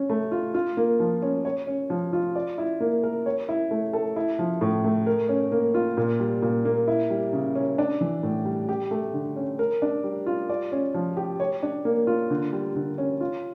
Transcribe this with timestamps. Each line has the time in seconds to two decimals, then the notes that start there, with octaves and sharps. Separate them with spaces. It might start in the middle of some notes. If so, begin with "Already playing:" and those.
Already playing: C#4
0.10 A3
0.32 F4
0.54 F4
0.77 A#3
1.00 F3
1.22 C#4
1.45 C#5
1.67 C#4
1.90 F3
2.13 F4
2.35 D5
2.58 E4
2.80 A#3
3.03 A#4
3.26 C#5
3.49 E4
3.71 A3
3.93 A4
4.16 E4
4.39 F3
4.61 A2
4.84 A3
5.07 A#4
5.29 C#4
5.52 A#3
5.74 F4
5.97 A#2
6.20 G3
6.42 A#2
6.65 A#3
6.88 E4
7.10 G3
7.33 C#3
7.55 C#4
7.78 D4
8.01 E3
8.23 A2
8.45 G3
8.69 G4
8.91 A3
9.13 D3
9.36 C#4
9.59 A#4
9.82 D4
10.04 G3
10.26 F4
10.49 D5
10.72 C#4
10.94 F3
11.17 G4
11.40 C#5
11.63 D4
11.85 A#3
12.07 F4
12.30 D3
12.53 G3
12.75 D3
12.98 C#4
13.21 F4